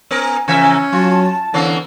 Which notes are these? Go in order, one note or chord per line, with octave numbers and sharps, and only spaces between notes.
B3 A#4 G#5
C#3 E3 C#4 A#4 E5 G#5
F#3 F4 A5
D3 E3 A#3 B3 C#4